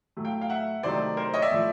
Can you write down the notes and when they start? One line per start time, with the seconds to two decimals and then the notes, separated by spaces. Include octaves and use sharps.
0.17 A2 F#3 A3
0.25 F5 G5
0.41 F5 G5
0.50 E5 F#5
0.83 C3 D#3 F#3 A3 C5 D5
1.17 A#4 C5
1.34 C#5 D#5
1.42 D5 E5
1.50 A2 F3 A3